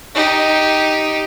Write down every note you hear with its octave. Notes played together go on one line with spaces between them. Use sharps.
D#4 G4